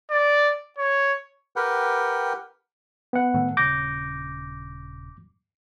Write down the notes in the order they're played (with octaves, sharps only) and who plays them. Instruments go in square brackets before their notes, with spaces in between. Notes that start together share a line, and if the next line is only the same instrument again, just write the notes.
[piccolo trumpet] D5
C#5
[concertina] G4 A#4 B4 F#5 G5
[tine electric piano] B3 F#5
[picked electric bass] A2 D#3 A3
[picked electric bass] D#1 C#3 [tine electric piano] D6 G6 A#6